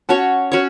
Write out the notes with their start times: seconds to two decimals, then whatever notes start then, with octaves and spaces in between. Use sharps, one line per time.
0.09 C#4 F#4 C#5 F#5 A5
0.52 C#4 F#4 C#5